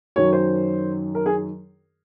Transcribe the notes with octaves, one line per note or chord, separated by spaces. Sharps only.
F#2 D#3 F#3 C#5
C5
A#4
G#4